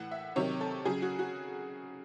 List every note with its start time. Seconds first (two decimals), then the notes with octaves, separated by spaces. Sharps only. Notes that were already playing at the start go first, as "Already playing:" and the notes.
Already playing: A2 E3 F#5
0.11 E5
0.36 C3 D#3 F#3 C#5
0.61 A4
0.85 C#3 F#3 G#4
1.02 F#4
1.19 F#4